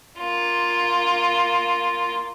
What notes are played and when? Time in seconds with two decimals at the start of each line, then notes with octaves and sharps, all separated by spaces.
0.19 A#3 F4